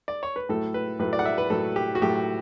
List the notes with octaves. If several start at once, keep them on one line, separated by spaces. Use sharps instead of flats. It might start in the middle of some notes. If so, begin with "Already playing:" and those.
D5
C#5
B4
A2 F#3 A3 A4
B4
A2 F#3 A3 B4
D5
F#5
E5
B4
A2 F#3 A3 A4
G4
F#4
A2 F#3 A3 G4